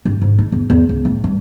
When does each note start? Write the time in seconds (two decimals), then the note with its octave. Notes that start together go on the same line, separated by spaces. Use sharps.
0.05 G2
0.22 G#2
0.38 D#4
0.52 E2
0.70 E2
0.89 C#2
1.05 A2
1.24 G2